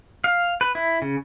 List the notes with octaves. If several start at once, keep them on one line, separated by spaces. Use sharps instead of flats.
F5
B4
E4
C#3